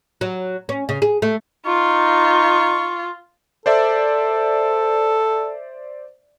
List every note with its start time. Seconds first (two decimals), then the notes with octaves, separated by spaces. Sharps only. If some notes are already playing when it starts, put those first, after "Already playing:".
0.21 F#3
0.69 C#4
0.89 C#3
1.02 G#4
1.22 A3
1.66 D#4 F4 C#6
3.66 A4 C5 D5 E5